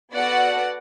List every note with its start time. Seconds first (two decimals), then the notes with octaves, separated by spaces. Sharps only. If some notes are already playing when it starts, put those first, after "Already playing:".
0.13 B3 F#4 A4 D5 F#5